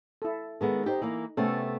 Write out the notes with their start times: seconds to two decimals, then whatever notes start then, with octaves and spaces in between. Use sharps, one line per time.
0.22 E4 A4
0.61 D#3 G#3 B3 A4
0.86 D#4 G4 C5
1.02 E3 A#3
1.37 C3 A3 B3 C#4 A4